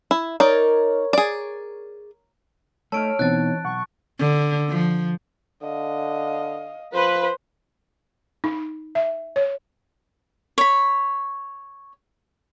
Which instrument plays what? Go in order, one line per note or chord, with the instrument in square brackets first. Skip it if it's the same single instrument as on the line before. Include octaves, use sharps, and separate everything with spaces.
[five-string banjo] E4
[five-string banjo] D#4 D5 [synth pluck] A#4 C#5
[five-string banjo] G#4 D5
[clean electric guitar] A3 D#4 [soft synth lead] C#5 [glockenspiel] A5 D7 [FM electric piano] E6 F6
[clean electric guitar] B2 [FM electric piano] E3 C4 D#4 [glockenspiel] F#6 A6
[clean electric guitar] B1 [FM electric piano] F#5 [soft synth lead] C#6
[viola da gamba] D3
F3
[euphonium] D3 [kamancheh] D#5 F5
[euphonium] F3 [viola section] B4 [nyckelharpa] C5
[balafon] D#4
E5
C#5
[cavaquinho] C#5 B5